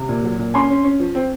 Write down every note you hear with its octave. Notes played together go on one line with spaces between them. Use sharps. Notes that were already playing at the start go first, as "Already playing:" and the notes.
Already playing: C3
A#2
F#3
A#2
C#4 G#5 C6
C#4
C#4
F3
C4